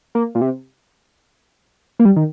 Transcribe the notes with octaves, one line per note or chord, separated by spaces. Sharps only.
A#3
A#2
C3
A#3
G3
D#3